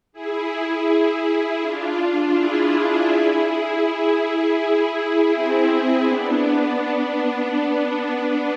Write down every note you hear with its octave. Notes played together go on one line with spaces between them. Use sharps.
E4 G#4
D4 F4
E4 G#4
E4 G#4
C4 E4
B3 D4